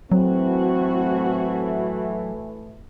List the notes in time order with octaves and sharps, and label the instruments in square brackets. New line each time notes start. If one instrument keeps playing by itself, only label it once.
[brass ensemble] A2 E3 A3 [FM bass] F#3 [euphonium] C4 [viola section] F#4